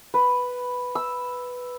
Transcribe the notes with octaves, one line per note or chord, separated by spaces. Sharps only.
B4
E6